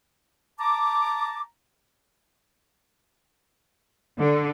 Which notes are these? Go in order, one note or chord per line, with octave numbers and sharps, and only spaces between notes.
A5 A#5 D6
D3